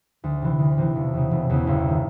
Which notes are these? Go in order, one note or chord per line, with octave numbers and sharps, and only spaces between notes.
D2
C3 E3
D2
C3 E3
E1
E2 C#3
E1
E2 C#3
G1
D#3